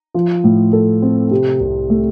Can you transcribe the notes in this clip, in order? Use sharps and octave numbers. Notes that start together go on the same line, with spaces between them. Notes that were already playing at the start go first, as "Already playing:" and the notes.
F3
A2
A4
C4
C3
C2
A3